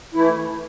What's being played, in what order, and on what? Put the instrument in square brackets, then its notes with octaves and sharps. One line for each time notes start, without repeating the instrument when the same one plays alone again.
[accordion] E3 A3 E4